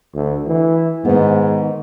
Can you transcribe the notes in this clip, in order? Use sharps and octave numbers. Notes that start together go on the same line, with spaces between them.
D2
E3
G#2 D#3 B3